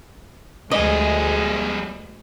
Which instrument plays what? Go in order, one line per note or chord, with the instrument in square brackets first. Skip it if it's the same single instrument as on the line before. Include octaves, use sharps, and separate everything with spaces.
[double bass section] D2 G#3 [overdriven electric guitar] G3 G#4 [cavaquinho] D#5